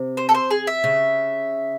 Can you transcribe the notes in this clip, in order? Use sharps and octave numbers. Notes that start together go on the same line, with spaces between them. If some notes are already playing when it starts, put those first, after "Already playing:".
Already playing: C3
C5
A4
C5
G#4
E5
C#3